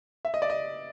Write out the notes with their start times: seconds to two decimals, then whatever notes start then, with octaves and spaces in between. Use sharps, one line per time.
0.25 E5
0.34 D#5
0.42 D5
0.50 D#5